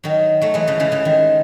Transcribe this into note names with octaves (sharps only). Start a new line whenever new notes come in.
D#3 F#3
F#3 A3
E3 G#3
C#3 E3
C#3 E3
C#3 E3
D#3